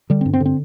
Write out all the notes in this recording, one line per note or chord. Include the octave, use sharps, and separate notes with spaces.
D3 G3
C4
G2
C4
D3
C4